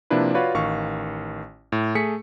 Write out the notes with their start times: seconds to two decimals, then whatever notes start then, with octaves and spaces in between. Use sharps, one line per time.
0.10 C3 F3 A#3 D4 E4 B4
0.34 F4 F#4 B4 C#5 D5 F5
0.54 A1 D#3 F5 C#6
1.72 A2
1.95 A3 G#4 B6 C#7